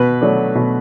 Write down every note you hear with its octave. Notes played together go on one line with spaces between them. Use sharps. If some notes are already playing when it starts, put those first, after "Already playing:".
Already playing: B2 B4
F#3 A3 D4
B2